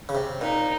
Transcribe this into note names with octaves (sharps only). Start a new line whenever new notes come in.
C#3
C3
A#2 D#4